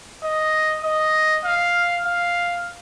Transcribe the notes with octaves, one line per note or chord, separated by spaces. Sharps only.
D#5
D#5
F5
F5